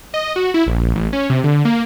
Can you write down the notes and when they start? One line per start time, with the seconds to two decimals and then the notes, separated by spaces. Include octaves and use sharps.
0.14 D#5
0.36 F#4
0.54 E4
0.66 A#1
0.95 A1
1.13 C#4
1.30 C3
1.44 D3
1.65 A#3